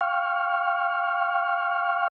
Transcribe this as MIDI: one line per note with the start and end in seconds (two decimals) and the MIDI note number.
0.01 2.08 77
0.01 2.08 79
0.01 2.08 85
0.01 2.08 89